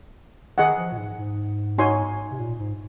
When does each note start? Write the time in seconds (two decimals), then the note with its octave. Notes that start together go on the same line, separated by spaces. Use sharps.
0.58 D#3 G#4 D#5 F#5
0.77 F3
0.92 A#2
0.97 G#2
1.18 G#2
1.78 D#4 F#4 C#5 G#5 C6
2.31 C3
2.39 A#2
2.59 G#2